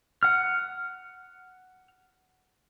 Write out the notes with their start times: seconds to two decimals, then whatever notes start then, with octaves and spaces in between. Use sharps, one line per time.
0.23 F#5 F6